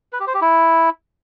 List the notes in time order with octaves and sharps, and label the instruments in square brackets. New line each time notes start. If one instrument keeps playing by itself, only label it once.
[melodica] B4
G4
C5
G4
E4